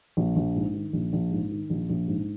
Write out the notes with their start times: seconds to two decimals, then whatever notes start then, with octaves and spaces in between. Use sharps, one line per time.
0.17 A#1
0.36 A#1
0.56 G#2
0.74 D#3
0.93 A#1
1.13 A#1
1.32 G#2
1.51 D#3
1.70 A#1
1.90 A#1
2.08 G#2